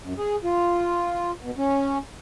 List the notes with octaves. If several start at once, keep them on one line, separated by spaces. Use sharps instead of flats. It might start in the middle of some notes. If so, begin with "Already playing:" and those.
F#2
G#4
F4
B2
C#4